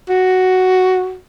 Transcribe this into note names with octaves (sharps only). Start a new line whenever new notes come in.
F#4